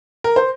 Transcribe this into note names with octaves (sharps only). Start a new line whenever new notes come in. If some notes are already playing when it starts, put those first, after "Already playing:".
A#4
C5